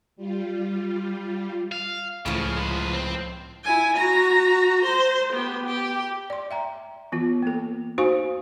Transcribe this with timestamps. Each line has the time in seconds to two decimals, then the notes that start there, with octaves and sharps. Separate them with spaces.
0.16 G3 F4
1.72 F5
2.26 C#2 A2 C#3 F3
2.57 G#3 B4
2.93 C4
3.64 E4 G#5
3.97 F#4 A#5
4.85 C5
5.33 B3 G4
5.65 G4
6.30 D5 C6
6.51 E5 G5 A#5
7.12 E3 B3 F4
7.42 A#3 A4
7.98 D#4 F#4 C5 F5 G#5 C#6